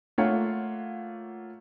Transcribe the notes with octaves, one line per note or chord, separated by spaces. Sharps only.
A3 A#3 F4 C#5 F5 F#5